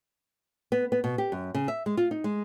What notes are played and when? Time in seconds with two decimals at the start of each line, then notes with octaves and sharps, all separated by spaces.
0.72 B3
0.92 B3
1.04 B2
1.18 G4
1.32 F#2
1.54 C#3
1.68 E5
1.86 G#3
1.97 F4
2.11 D#4
2.24 G#3